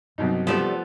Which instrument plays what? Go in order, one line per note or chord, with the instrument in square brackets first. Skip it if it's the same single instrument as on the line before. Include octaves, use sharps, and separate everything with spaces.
[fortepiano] C2 B2 D#4 [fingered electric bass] G2 F#3
[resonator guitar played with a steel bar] F3 A3 B3 [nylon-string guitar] G3 D5